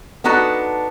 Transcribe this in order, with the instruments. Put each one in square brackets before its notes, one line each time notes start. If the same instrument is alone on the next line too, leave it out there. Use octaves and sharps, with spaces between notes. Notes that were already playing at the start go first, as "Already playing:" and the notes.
[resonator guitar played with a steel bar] B3 D4 D#4 F#4 A4